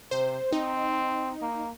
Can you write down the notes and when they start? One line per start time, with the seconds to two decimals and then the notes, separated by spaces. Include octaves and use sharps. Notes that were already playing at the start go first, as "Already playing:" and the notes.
0.11 C3 C5
0.52 C4 D#4
1.42 A#3